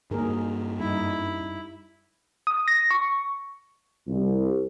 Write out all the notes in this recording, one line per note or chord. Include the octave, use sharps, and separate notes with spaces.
G2 A#3 D#4 G#4 A#4
F#2 G3 D#4 E4
D#6
A#6
C#6
C2